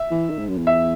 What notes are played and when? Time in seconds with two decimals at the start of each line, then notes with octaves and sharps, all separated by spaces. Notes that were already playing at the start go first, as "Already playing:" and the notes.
Already playing: E5
0.11 E3
0.30 D#3
0.39 G#2
0.48 F#2
0.58 E2
0.67 E5